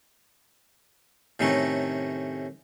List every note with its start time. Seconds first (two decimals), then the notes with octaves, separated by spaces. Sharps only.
1.39 A2 C3 D#3 A3 C#4